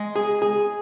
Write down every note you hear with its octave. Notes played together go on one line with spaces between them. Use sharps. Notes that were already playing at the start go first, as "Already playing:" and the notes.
Already playing: G#3
G#4
G#4